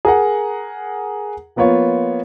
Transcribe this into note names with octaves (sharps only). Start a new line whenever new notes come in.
G#4 A#4 F#5
F3 A#3 B3 F4 C#5